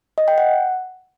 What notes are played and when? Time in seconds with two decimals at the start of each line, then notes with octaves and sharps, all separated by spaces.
0.18 D#5
0.28 G5
0.38 F#5